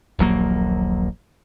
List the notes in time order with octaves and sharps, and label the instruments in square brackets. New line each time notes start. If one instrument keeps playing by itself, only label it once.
[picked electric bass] D#1 A#1 F#3 A#3